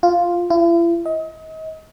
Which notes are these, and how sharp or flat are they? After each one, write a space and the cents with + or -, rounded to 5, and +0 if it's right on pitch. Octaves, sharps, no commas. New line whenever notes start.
F4 +0
E4 +45
D#5 +35